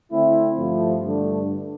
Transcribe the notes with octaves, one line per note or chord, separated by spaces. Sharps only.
D3 A3 C4 E4
G2 F3 A3
G2 D3 A3 D4